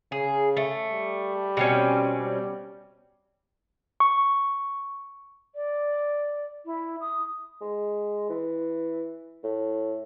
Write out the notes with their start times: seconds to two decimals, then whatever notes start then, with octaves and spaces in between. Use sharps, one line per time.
0.12 C#3 G#4
0.57 A3
0.91 G3
1.57 B2 C4 C#4
2.17 G3
4.00 C#6
5.55 D5
6.66 E4
7.01 D#6
7.61 G#3
8.30 E3
9.44 A2